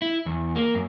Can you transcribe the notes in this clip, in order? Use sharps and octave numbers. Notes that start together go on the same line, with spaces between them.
E4
E2
A#3
F#2